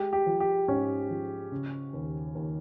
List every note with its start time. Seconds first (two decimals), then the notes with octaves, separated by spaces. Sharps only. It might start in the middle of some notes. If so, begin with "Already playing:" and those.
Already playing: G#3 G4
0.13 G4
0.26 F3
0.40 G4
0.68 G#2 C#4
1.10 F3
1.52 C#3
1.93 D#2
2.35 D#2